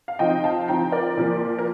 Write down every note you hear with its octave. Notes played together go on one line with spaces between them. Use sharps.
F5
F3 C4 D#4 D#5 G5
F5 A5
F3 C4 D#4 G5 A#5
A#4 D5
A#2 F3 A#3 F4
A#4